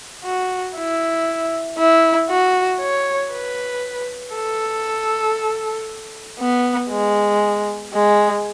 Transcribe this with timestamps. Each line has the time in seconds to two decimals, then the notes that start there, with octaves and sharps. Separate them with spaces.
0.25 F#4
0.76 E4
1.78 E4
2.30 F#4
2.81 C#5
3.32 B4
4.35 A4
6.40 B3
6.90 G#3
7.94 G#3